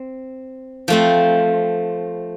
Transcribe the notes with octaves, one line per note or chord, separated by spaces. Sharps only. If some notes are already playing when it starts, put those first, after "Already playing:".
Already playing: C4
F3 A3 C4